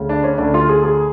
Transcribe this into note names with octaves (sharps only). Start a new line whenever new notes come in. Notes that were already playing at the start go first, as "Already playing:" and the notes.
Already playing: D2 C#3
D4
C#4
D2 D3 D4
F4
G#4
G#4